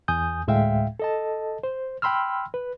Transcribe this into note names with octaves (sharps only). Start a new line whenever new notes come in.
E2 G#5 D#6 G6
D2 A2 G#3 E5 F5 G5
A4 D#5 A5
C5
G5 B5 C6 E6 F6
B4